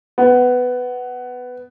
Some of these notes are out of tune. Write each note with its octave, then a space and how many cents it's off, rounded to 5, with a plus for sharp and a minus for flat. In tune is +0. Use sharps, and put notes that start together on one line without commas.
B3 +10